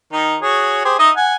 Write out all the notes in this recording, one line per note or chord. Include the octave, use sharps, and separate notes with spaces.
D#3 D#4
F#4 G#4 C#5
G4 G#4 C5
D#4 D#5 E5
F#5 G#5